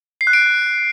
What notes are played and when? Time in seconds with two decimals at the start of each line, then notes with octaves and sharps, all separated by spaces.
0.21 C7
0.27 F#6
0.33 D7